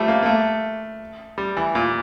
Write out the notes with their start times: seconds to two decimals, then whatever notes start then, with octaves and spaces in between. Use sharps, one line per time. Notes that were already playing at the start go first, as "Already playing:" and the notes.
Already playing: F3 G3 A3
0.08 A#3
0.22 A#3
0.26 A3
1.38 G3
1.57 E3
1.75 A#2